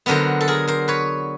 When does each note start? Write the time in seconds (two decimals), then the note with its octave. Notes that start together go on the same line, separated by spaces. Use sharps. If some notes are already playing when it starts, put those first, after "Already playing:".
0.06 D3 F#3 B3 D4 A#4 C5
0.41 A4
0.48 G#4 A#4
0.68 A#4 C5
0.88 B4 C#5